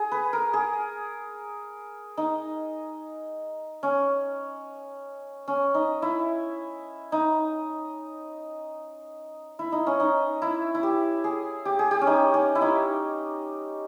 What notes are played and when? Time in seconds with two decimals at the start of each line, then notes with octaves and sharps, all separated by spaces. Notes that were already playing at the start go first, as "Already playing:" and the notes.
Already playing: G#4
0.12 B4
0.33 A#4
0.53 G#4
2.17 D#4
3.83 C#4
5.48 C#4
5.74 D#4
6.02 E4
7.12 D#4
9.59 E4
9.72 D#4
9.87 C#4
10.00 D#4
10.42 E4
10.75 E4
10.83 G4
11.24 G#4
11.65 G4
11.79 G#4
11.91 G4
12.01 C#4
12.07 D#4
12.34 C#4
12.55 E4
12.61 D#4